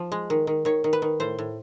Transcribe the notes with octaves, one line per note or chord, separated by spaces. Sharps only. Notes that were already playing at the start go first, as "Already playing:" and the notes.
Already playing: F3
G#3
D#3
D#3
D#3 C#5
D#3
B4
D#3
A2 C5
A2